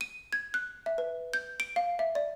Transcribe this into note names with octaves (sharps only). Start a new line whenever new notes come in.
D#7
G#6
F#6
E5
B4
G6
D7
F5
E5
D5